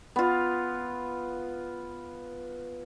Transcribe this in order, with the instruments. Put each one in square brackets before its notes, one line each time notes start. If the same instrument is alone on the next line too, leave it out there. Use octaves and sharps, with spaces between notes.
[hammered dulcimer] B3 F4